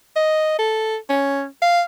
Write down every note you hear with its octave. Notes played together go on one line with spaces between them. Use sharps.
D#5
A4
C#4
F5